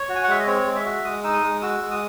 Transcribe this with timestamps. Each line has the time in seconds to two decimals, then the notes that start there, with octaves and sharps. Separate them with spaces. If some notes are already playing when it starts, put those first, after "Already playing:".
Already playing: C#5
0.09 F#4
0.15 G#5
0.24 F#5
0.28 G#3 E5
0.39 D#5
0.47 C4 C#5
0.66 G#3
0.76 E5
0.85 F#4
1.04 G#3 D#6
1.24 D#4 E6
1.33 D#6
1.43 G#3
1.62 F#4 E6
1.81 G#3
1.91 D#6